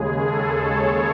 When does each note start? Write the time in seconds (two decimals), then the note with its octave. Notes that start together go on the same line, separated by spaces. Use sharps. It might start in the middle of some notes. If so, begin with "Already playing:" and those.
Already playing: D#2 C#3 G#3 G#4
0.23 A4
0.61 C#5